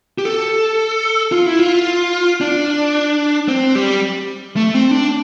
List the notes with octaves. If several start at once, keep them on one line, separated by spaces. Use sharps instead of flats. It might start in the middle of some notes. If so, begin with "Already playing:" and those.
G4
A4
F4
E4
F4
D4
C4
G3
A3
C4
D4